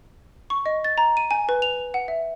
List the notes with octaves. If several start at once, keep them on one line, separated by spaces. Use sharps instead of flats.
C#6
D#5
A6
A#5
D#7
G#5
B4
F7
F#5
E5